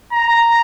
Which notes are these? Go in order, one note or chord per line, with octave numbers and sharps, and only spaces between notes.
A#5